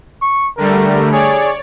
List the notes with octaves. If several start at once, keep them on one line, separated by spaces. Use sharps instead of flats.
C#6
D3 G3 A3 A#4
G#4 C#5 D5